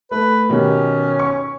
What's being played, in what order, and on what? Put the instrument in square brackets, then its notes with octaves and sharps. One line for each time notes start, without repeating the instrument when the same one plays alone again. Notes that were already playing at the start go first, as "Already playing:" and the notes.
[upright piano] A3 [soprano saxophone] B4
[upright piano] B2 D#3 G4 [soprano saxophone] C#4
[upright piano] C#6